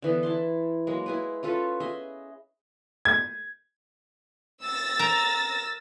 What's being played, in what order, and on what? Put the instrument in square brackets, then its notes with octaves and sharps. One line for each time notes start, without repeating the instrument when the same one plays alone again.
[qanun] D3 E3 B3
E4 A5 C6
F#3 G#3 A#3
E4 G#4 B4
C#4 F4 A4 B4
G#4 D#5 E5
[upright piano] G#6
[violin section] E6 A6 A#6
[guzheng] A#4 A#5